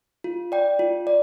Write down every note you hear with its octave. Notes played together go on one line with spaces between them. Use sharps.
F4
D5 G5
F4
D5